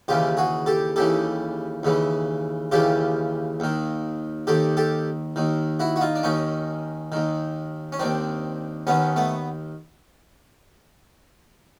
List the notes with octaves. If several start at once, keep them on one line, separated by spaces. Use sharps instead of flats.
D#2 C#3 E3 F4 G4
F#4 G#4
G4 A4
D#2 C#3 E3 G4 A4
D#2 C#3 E3
D#2 C#3 E3 F4 G4
D#2 D#3
D#2 D#3 G4 A4
G4 A4
D#2 D#3
E4 F#4
F#4
D#4 F4
D4
D#2 D#3 C#4 D#4
D#2 D#3
C#4
D#2 D#3 C4 D4
D#2 D#3 B3 C#4
A3 B3